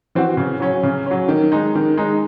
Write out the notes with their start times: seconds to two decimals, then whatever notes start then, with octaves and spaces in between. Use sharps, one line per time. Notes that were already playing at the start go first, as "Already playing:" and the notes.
0.15 E3 C4 F#4
0.37 C#3
0.60 F#3 C#4
0.83 C#3
1.06 F#3 C#4
1.28 D#3
1.52 G#3 D#4
1.75 D#3
1.97 G#3 D#4